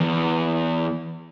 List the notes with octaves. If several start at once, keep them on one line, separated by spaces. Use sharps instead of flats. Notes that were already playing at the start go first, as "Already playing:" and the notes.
E2